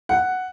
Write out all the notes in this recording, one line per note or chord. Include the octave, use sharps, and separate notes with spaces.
F#5